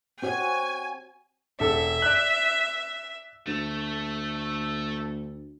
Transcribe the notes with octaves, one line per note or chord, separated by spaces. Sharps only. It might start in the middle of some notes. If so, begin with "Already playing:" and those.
C4 F#4 C#5 G#5
E1 A4 E5
D5 F#6
D2 A3